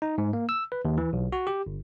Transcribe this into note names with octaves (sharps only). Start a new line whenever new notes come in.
D#4
G#2
A#3
E6
B4
D#2
E3
B1
F#4
G4
G1